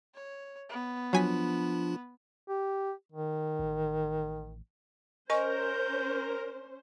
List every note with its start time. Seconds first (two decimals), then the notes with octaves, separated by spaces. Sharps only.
0.15 C#5
0.70 B3
1.13 F3 F#3 D4 F4 G#5 B6
2.48 G4
3.12 D#3
3.59 A1
5.30 C#4 A#4 C5 D#5 G#5 C#6 G6